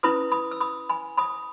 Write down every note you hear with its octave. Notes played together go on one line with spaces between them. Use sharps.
C#4 E4 B4 B5 D#6
B5 D#6
E6
B5 D#6
G#5 B5
B5 D#6